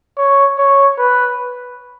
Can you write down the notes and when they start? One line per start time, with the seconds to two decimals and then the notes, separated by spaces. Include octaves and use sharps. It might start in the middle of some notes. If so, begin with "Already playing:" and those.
0.18 C#5
0.58 C#5
0.98 B4